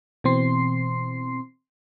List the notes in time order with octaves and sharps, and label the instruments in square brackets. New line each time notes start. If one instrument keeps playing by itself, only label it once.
[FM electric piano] B2 E3 C4 C6 C7